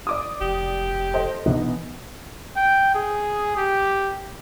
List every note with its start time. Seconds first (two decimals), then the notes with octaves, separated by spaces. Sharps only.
0.07 D5 D6 D#6
0.41 F1 G4
1.13 A4 C5 D#5
1.46 B2 E3 B3 D4 D#4
2.56 G5
2.95 G#4
3.57 G4